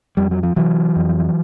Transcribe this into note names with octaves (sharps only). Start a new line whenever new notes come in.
F2 G3
F#3
F3
C3 E3 F#3
F2